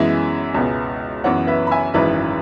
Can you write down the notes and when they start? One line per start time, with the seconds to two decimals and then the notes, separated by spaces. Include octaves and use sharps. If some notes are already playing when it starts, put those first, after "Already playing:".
Already playing: F#2 E3 G#3 B3 E5 G#5
0.54 C#2 B2 B3
1.24 F#2 E3 B3 C#5 F#5
1.47 B4 E5
1.67 B5
1.71 E5 G#5
1.94 G#1 F#2 E3 G#3 B4 E5